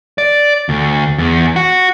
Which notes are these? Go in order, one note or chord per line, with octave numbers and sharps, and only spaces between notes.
D5
D2
E2
F#4